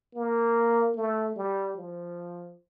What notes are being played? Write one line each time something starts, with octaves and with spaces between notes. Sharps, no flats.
A#3
A3
G3
F3